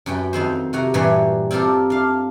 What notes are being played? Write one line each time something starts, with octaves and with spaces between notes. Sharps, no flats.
F#2 F#4 B4 G5
F2 D#3 C4 C5
C3 F#4 F#5 A#5
G2 A#2 E3 G3 C5 C#5
C4 F4 G4 A4 A#4
D4 F5